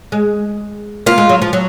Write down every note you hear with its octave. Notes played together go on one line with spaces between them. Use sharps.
G#3
A#3 F4
G#3
F#3
F3
F#3